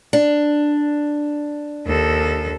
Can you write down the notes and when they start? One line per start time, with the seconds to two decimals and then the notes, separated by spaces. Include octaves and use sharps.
0.13 D4
1.87 D#2 A4